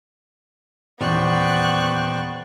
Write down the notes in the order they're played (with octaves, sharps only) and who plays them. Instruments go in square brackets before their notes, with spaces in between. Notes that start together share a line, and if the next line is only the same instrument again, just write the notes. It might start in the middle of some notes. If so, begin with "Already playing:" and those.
[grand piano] D#1 E2 [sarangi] B3 [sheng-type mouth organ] C5 D5 G5 [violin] C#6 F#6